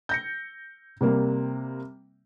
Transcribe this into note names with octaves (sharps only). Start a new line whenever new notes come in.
G6 A#6 C#7
C3 G3 A#3